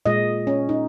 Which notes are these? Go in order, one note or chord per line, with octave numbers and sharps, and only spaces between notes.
A#2 G#3 D#5
C#4
D#4